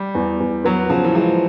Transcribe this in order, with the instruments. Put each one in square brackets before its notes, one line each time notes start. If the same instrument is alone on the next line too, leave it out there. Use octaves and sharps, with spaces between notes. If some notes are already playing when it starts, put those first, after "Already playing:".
Already playing: [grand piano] G3
[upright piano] E2
E2
[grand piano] F#3 [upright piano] B3
[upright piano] C#3 [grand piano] F3
[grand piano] E3
[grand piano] F3 [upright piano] G#3